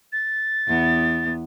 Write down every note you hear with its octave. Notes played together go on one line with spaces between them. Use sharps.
A6
E2 B3